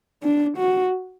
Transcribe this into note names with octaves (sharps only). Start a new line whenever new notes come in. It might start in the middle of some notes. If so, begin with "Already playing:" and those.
D4
F#4